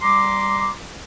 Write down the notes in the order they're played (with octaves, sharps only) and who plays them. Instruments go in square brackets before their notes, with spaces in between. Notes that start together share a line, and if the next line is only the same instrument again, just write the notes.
[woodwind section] G3 A#5 C6 D6